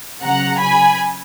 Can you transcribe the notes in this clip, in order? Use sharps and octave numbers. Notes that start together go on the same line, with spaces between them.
C#3 F#3 F#5 A#5
G#5 B5